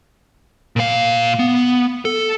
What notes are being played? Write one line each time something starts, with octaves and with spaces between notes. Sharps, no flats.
A#2 F5
B3
A4